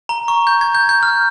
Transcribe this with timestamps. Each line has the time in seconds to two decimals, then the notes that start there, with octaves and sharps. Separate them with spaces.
0.09 A#5
0.28 C#6
0.47 G6
0.61 G#6
0.75 G6
0.89 G6
1.03 F6